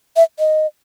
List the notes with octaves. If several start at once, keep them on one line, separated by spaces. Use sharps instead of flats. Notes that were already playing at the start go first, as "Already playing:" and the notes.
E5
D#5